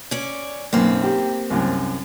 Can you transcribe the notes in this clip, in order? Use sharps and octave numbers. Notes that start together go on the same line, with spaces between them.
C#4 D5
B1 F#2 A#3 C4
G4
C2 F#2